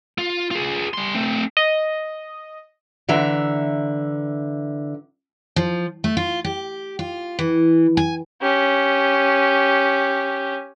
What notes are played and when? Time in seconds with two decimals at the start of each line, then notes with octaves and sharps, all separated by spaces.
0.18 F4
0.51 F4 G#4
0.94 G3 C6
1.14 A3 C4
1.57 D#5
3.09 D3 E3 E5 A#5
5.56 F3
6.04 A3
6.17 F4
6.44 G4
6.99 F4
7.39 E3
7.97 G#5
8.42 C#4 G4